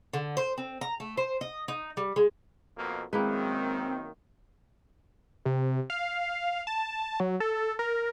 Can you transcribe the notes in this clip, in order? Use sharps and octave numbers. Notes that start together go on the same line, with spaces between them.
D3
C5
C4
A#5
A3
C5
D#5
D#4
G3
G#3
F2 B2 A#3
F#2 D#3 G#3 A#3 C4 E4 B4
C3
F5
A5
F#3
A4
A#4